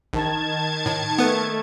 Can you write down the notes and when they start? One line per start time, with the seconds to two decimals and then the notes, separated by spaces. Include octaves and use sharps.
0.13 A#1 D#3 A5 G#6
0.86 A2
1.19 A3 B3 B4